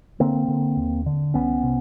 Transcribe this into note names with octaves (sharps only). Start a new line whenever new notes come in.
D3 A#3 C4
D3
D#2
D3
C2 B3 C#4
C3